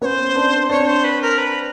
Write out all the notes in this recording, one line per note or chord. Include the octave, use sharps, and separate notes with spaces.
B3 C#4 C5 C#5
C4 D4
C4 D4 C#5
C5
B4
A#4
B4